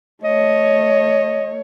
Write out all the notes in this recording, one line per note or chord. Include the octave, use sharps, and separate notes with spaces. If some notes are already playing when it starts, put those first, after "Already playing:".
A3 C#5 D#5